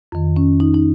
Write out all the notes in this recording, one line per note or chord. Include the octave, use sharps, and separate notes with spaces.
F2 D#3
C#4
D#4
D#4